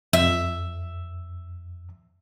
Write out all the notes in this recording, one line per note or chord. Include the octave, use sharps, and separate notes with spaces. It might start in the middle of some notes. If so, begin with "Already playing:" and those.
F2 E5